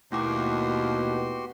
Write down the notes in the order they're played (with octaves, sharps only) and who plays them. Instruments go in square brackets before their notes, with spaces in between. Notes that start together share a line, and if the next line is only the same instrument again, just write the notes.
[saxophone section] D#2 [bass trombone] B2 [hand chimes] A3 E4 D6 [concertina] F#4 G4 C6